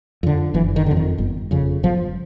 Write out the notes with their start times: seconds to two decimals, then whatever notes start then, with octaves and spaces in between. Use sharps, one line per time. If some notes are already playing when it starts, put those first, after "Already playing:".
0.23 F2 D3
0.54 F#1 E3
0.76 D#3
0.86 F2 D3
0.97 D#3
1.18 G1
1.51 F2 C#3
1.83 G1 F3